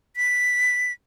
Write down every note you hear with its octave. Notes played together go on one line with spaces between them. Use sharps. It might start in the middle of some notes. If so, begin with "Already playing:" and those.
B6